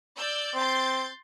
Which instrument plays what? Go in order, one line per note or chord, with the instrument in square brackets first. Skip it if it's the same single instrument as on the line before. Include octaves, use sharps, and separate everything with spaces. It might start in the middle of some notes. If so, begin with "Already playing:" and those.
[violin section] D5 E6 G6
[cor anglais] C4 [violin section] C6 G6 A6